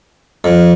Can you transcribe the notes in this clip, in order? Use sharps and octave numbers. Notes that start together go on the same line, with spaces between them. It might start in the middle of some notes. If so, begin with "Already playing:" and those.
F2